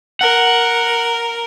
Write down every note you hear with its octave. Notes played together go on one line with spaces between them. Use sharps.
A#4 F#5